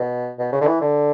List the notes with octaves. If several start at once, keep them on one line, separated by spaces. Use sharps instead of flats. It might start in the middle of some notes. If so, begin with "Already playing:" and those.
Already playing: B2
B2
C#3
D3
E3
D3